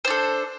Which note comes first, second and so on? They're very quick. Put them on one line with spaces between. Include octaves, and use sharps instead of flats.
C5 D4 A4